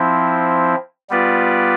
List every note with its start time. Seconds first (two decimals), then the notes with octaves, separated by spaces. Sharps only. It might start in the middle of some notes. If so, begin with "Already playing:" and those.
Already playing: F3 C4 E4
1.10 G3 B3 F4 B4 D5